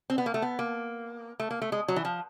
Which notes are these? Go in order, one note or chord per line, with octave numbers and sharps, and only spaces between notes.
C4
B3
A#3
A3
B3
A#3
A3
A#3
A3
G#3
F#3
E3
F3